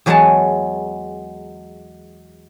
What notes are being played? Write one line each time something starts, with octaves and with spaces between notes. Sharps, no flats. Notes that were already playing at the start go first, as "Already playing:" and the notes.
E2 F#3 G#3 C#5 F#5 A5